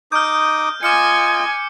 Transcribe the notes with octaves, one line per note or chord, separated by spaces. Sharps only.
D#4 D6 D#6 F6 G6
F4 D#5 G#5 D6 F6 C#7